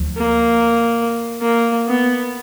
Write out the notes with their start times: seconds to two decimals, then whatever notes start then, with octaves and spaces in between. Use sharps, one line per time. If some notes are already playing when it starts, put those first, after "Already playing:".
Already playing: D2 F3
0.17 A#3
1.41 A#3
1.87 B3